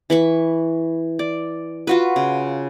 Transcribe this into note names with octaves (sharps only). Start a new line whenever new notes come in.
E3 B5 C#6
D5
F4 F#4 B4
C#3